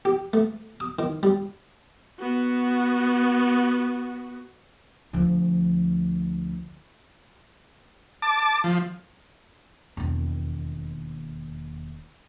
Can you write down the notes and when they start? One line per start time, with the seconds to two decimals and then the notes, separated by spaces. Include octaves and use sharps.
0.05 G4
0.33 A3
0.80 D#6
0.99 D#3
1.23 G3
2.20 B3 F#4
5.13 D2 F3
8.22 A5 D6
8.64 F3
9.97 E1 D#2